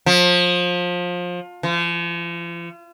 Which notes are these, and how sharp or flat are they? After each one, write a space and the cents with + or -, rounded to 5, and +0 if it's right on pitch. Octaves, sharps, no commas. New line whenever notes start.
F3 +25
F3 -40